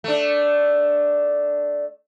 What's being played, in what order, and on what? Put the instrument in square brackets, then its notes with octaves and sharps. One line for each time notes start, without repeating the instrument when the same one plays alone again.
[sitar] A3 D4